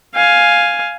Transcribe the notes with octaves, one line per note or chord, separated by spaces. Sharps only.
F5 G#5